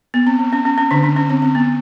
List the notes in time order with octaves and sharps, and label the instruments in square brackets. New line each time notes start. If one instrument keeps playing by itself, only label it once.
[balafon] B3
C4
C4
C#4
C#4
C#4
D3 D4
D3 D4
C#4
C4
C4
B3